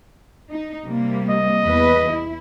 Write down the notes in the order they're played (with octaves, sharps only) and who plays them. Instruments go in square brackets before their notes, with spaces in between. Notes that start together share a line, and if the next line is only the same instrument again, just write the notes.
[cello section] D#4
C3 G3 A#3
[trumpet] D#5
[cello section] E2 B4
E4